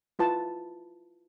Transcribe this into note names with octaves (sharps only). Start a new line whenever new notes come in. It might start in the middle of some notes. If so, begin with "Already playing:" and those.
E4 F4 B4 A5